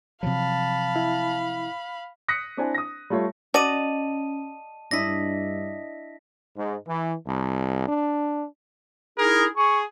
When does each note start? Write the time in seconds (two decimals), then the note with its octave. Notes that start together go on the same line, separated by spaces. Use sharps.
0.23 C3 F3 F#3 F5 A5 B5
0.96 E4
2.28 D#6 F#6 A#6 B6 C#7
2.57 C4 D4 E4 C5 G#5
2.74 D#6 A#6
3.10 G3 A3 F4 C#5
3.54 C#4 F#4 D5 D#5 A5 D#7
4.91 G2 D4 E4 D#5 A#6 B6
6.57 G#2
6.87 E3
7.26 C2
7.87 D4
9.18 D#4 E4 G#4 A#4
9.56 G#4 C#6